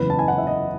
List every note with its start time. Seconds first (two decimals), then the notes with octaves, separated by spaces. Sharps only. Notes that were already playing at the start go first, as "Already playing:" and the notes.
Already playing: F#1 E2 C#3 B4
0.10 A5
0.19 G#5
0.28 F#5
0.38 E5
0.47 D#5